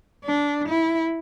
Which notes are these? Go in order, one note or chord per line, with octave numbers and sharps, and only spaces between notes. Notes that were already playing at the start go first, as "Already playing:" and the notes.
D4
E4